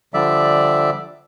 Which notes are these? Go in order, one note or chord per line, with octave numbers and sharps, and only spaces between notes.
D3 F3 G3 D5 E5